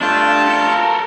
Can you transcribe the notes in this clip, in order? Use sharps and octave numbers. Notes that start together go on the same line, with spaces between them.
A3 D4 F4 G5 A5
A4 A#4